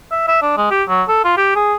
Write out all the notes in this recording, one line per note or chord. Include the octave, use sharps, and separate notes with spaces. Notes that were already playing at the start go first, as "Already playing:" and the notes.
E5
E5
D4
G#3
G4
F#3
A4
F4
G4
G#4